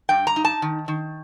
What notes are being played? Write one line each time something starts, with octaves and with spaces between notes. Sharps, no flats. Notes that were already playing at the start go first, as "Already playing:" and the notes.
G2 G5
A#5
D#4
A5
D#3
D#3